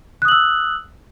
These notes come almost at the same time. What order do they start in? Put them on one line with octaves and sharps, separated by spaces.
F#6 D#6 F#7 E6